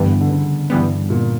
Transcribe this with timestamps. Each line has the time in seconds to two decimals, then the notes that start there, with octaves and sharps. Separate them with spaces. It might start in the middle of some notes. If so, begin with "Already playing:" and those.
Already playing: G2 D3 E3 G3 B3
0.21 D3
0.30 C#3
0.70 G2 E3 G3 B3
1.10 A#2